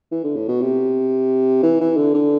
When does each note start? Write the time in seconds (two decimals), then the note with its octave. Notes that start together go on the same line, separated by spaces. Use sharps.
0.11 E3
0.24 D3
0.36 A2
0.48 B2
0.61 C3
1.63 E3
1.81 E3
1.97 D3
2.14 D3